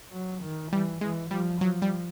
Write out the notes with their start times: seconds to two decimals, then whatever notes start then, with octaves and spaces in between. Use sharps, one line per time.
0.13 F#3
0.43 D#3
0.72 E3 G3
1.01 E3 G#3
1.30 F3 G3
1.61 F3 F#3
1.82 G3